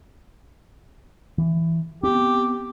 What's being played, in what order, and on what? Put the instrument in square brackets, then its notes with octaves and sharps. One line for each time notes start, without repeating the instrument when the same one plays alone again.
[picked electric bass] E3
[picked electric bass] B3 C4 [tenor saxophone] G4